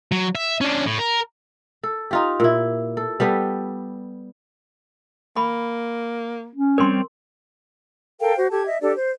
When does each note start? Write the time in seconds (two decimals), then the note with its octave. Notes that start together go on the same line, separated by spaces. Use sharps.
0.12 F#3
0.35 E5
0.61 C#4 D4
0.86 A2
0.99 A#4
1.83 A4
2.11 D#4 F4 G4
2.40 A#2 E4
2.97 A4
3.20 G3 B3 G4 A4
5.36 A#3 B5
6.56 C#4
6.78 G3 C4 A#4 C#5 C6
8.20 A4 A#4 F5 G5
8.36 F#4 C5
8.50 G4 A4 A5 G#6
8.66 D#5 E5
8.81 D4 G4 A4 D5
8.97 C5